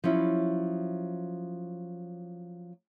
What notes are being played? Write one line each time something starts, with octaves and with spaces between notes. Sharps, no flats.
F3 F#3 C#4 E4